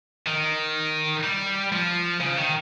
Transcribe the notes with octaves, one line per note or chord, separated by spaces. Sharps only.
D#3
G3
F3
C#3
D#3